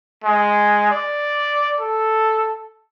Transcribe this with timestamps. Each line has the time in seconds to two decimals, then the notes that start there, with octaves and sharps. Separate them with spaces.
0.24 G#3
0.91 D5
1.80 A4